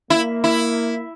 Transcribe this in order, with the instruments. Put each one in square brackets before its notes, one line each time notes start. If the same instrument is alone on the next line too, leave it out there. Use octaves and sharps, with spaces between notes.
[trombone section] A#3 [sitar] E4
[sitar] E4